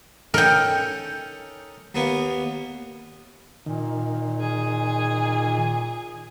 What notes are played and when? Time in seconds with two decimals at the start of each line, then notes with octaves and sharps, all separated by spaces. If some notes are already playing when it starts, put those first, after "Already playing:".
0.34 C#4 D#4 A4 A#4 G5
1.95 D#2 A#3 B3
3.66 A#2 D#3
4.40 G#4